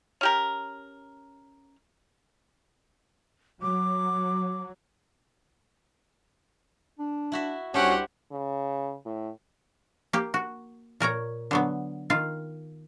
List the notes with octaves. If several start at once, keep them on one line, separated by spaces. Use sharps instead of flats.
C#4 G4 A#4
F#3 D6
D4
E4 F#4 E5
C2 C#4 D4 E4 F#4 G4 C5 F#5
C#3
A2
A#3 G4
F#4
A#2 A#4 C#5 A#5
D3 F#3 B3
D#3 F4 F5